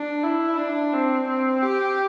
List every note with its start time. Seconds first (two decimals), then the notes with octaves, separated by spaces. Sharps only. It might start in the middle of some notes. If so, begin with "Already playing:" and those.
Already playing: D4
0.24 E4
0.58 D4
0.94 C4
1.28 C4
1.63 G4